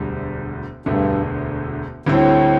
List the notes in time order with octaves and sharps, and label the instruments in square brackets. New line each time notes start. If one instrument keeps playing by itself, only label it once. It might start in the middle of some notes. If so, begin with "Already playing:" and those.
Already playing: [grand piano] E1 D2 D3 G3
[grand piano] E1 D2 D3 A3 [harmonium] G2
[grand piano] D2 D3 G3 C4 [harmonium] A2